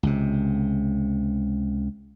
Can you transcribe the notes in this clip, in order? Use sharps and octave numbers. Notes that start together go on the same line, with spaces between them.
C#2 C3